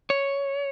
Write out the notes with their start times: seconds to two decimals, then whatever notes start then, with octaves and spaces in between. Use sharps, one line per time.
0.10 C#5